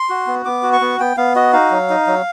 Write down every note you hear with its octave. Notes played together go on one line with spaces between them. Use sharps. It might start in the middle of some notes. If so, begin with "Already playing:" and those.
Already playing: C6
F#4
B3
B3 D6
F#4
C#6
B3
B3 G5
B3 F5
F#4 D#5
D#4 F5
F#3
D#4
F#3